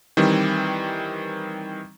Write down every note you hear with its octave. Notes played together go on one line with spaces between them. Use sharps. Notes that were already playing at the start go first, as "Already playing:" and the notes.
D#3 E3 G3 C4